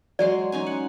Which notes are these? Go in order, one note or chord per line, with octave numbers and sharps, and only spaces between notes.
F#3 G#3 D5 C6
C#4 D#4 G#5
F#5